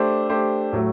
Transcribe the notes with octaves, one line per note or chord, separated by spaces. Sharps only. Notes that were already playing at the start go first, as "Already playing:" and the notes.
Already playing: A3 D4 G4 C5
A3 D4 G4 C5
A2 F#3 A3